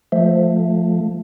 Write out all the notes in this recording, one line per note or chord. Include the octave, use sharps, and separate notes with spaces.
F3 A3